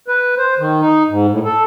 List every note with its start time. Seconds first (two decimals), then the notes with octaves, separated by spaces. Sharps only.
0.08 B4
0.38 C5
0.59 D#3
0.81 D#4
1.09 G#2
1.31 A2
1.45 A4